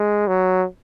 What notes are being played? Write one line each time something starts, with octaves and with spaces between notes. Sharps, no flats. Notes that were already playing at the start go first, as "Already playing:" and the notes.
Already playing: G#3
F#3